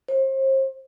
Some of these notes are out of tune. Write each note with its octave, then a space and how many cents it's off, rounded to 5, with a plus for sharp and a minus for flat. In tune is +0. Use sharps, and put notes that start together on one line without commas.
C5 +35